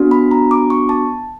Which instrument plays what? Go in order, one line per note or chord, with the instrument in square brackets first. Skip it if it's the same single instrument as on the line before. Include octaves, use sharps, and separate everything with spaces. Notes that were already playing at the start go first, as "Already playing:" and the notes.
Already playing: [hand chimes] B3 D4 F#4
B5
A#5
D6
C#6
A5